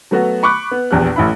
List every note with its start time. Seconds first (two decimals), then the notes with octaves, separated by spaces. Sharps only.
0.11 F#3 A3 B3 F#4
0.43 B5 C#6 D6 F#6
0.71 B3
0.91 A#1 E2 G4 F#6
1.16 A1 E4 B5